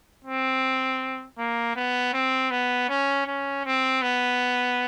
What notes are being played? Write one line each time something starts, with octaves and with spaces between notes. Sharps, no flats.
C4
A#3
B3
C4
B3
C#4
C#4
C4
B3